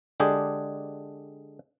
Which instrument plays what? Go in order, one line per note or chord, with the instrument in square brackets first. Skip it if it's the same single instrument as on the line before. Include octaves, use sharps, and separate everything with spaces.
[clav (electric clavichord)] D3 G#3 D4 G4 G#4